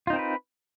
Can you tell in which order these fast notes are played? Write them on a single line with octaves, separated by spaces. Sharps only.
F4 D#4 C4 A#4 B4